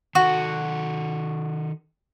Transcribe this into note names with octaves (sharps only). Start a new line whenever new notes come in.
D#3 F#4 A4